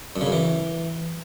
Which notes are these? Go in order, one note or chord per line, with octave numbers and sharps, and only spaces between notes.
F#2
C#3
F#2
E3